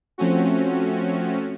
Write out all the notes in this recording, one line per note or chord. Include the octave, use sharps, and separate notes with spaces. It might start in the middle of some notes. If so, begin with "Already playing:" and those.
F3 A3 C4 C#4 F#4